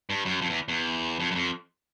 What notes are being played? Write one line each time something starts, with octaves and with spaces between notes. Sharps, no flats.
G2
F#2
F2
E2
E2
F2
F#2
F2